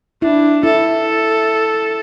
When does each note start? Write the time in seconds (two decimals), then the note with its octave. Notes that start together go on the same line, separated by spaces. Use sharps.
0.22 D4 E4
0.64 E4 A4